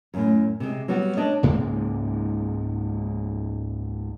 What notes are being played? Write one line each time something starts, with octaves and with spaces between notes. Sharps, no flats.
F#2 A2
C3 G#3
F#3 G3 B3 F#4
D4 C#5 D#5
C#2 G#2 G#3 A#3